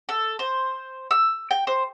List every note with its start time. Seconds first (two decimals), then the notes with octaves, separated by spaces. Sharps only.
0.09 A4
0.39 C5
1.11 E6
1.51 G5
1.67 C5